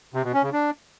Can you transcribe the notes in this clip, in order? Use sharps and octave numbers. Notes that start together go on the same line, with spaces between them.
C3
B2
C#4
C#3
D4